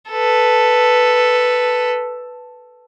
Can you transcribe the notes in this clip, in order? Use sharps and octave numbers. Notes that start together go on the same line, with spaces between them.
A4 B4